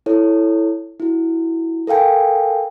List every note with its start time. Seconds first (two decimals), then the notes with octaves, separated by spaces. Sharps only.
0.06 E4 A4 C#5
1.00 E4 F#4
1.87 A4 A#4 F5 G5 G#5